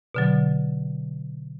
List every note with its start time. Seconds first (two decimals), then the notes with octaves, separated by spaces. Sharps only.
0.15 B2 D3 F#3